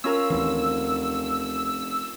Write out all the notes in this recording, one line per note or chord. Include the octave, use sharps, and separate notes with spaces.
C#4 F4 A#4 E6
F1 D#2 E3